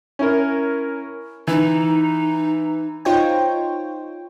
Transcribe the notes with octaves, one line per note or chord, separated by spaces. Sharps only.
C#4 E4 A#4
E3 D#4
D#4 F4 C5 C#5 G5